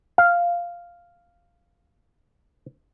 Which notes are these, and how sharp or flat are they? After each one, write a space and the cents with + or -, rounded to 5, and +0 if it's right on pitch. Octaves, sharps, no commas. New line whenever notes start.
F5 -5